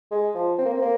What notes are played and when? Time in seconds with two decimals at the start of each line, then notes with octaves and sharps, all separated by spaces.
0.11 G#3
0.35 F3
0.58 C4
0.65 A#3
0.73 C4
0.82 A#3